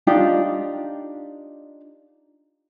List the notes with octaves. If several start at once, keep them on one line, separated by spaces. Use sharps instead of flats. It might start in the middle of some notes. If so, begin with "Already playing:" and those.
D4 D#4 F4 G4